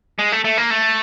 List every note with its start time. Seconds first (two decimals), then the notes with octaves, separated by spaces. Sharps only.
0.19 G#3
0.32 A3
0.44 A3
0.57 A#3
0.70 A3